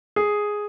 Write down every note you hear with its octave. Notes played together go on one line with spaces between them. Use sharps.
G#4